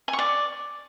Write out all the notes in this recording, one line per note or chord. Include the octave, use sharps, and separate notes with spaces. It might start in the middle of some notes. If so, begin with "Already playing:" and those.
G#5
C#6
D5